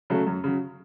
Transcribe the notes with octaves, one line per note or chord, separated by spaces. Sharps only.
C#3 F#3 A3
F#2
C#3 F#3